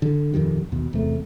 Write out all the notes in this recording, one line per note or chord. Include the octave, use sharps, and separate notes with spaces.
D3
D#1 F2 D#3 G3
D#2 B2
E2 C3 A3